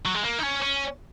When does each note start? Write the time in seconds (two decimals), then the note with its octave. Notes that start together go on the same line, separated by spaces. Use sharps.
0.05 F#3
0.14 G#3
0.23 A#3
0.39 D#4
0.43 C#4
0.62 C#4